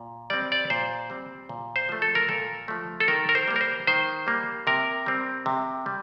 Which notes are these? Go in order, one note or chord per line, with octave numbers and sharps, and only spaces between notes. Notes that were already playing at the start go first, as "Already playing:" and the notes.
Already playing: A#2
G3 C4 D5
D5
A#2 C5
G3 C4
A#2
C5
F3 A3
A4
A#4
A#2 A4
F3 A3
A4
D#3 A#4
A#4
C5
G3 A#3
A#4
C5
D#3 C5
G3 A#3
C3 A#4
G3 C4
C3
G3